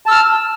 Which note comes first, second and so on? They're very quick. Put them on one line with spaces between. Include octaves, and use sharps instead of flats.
A5 E6 F6